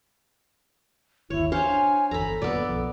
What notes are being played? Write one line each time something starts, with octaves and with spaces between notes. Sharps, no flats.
G1 D#2 E4 C#5
D4 C5 C#5 F5 G#5
G1 E2 A4 A#5 B5
F#2 A#2 D3 B3 D5
B1 F3